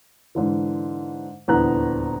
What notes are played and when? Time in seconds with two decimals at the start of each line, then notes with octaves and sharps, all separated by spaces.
0.35 G#2 D3 E3
1.48 D#1 E2 D3 B3 A#5 F#6